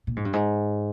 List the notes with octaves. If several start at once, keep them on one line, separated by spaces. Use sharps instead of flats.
A#2
G#2
G2
G#2